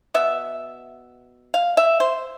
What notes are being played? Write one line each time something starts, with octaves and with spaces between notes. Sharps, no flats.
B2 B3 E5
F5
E5
C5